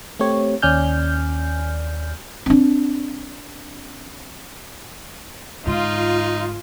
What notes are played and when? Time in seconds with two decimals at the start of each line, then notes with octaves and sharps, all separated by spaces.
0.20 A3 C4 G4 C#5
0.62 D#2 C#4 D5 G#5 F6 G6
2.46 C4 D4
5.67 G#2 D3 D#4 F4